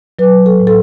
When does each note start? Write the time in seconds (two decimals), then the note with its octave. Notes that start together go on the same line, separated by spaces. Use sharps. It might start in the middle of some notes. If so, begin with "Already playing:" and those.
0.19 F#3 B4
0.46 A4
0.60 A2
0.67 A4